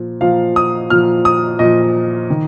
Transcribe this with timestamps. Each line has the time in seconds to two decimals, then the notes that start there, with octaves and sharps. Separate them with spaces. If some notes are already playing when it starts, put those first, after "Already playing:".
Already playing: A#2 F3
0.21 A#2 F3 F5
0.56 D#6
0.90 A#2 F3 F6
1.25 D#6
1.59 A#2 F3 D#5
2.30 D#3